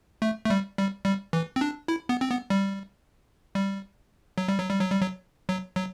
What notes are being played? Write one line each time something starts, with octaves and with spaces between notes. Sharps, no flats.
A3
A3
G3
G3
G3
E3
C4
D4
E4
B3
C4
B3
G3
G3
F#3
G3
F#3
G3
F#3
G3
F#3
F#3
F#3